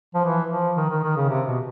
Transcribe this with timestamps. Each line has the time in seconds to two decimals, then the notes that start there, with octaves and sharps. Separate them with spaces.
0.15 F3
0.25 E3
0.50 F3
0.76 D#3
0.90 D#3
1.03 D#3
1.16 C#3
1.29 C3
1.47 B2